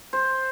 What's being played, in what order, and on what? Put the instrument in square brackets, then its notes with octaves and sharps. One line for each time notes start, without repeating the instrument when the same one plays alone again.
[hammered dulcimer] C5